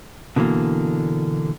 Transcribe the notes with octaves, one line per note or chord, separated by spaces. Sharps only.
B2 D3 E3 G3 A#3